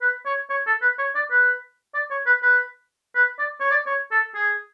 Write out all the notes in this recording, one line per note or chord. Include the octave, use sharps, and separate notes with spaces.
B4
C#5
C#5
A4
B4
C#5
D5
B4
D5
C#5
B4
B4
B4
D5
C#5
D5
C#5
A4
G#4